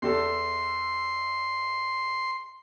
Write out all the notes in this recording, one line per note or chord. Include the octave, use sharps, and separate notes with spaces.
E2 G4 A4 C6